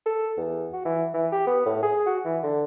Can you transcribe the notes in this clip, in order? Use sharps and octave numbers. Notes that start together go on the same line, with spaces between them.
A4
E2
F#4
E3
E3
G4
B3
A2
G#4
F#4
E3
D3